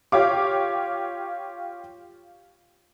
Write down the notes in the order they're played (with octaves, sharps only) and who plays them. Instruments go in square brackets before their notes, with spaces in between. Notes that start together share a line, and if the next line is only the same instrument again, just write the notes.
[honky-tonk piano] F4 G4 C#5 F5 D6